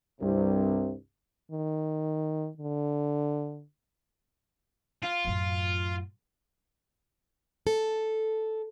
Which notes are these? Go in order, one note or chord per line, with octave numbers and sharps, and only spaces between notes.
C2 G2 C3
D#3
D3
F4
F#2 A2
A4